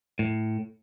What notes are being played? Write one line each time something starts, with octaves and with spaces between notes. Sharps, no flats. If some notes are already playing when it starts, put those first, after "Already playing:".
A2